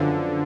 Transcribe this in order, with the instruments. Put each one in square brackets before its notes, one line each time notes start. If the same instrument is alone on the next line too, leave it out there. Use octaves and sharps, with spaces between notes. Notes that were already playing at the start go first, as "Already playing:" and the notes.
Already playing: [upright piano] F#2 F3 B3 D4 F4 [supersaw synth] D3